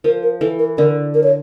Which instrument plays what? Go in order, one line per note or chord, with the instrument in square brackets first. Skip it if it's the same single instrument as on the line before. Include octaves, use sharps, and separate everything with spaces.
[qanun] F3 [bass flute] A#4
[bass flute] A#4
[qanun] E3 [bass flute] A4
[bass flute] A#4
[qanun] D3 [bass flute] A#4
[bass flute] A#4
C#5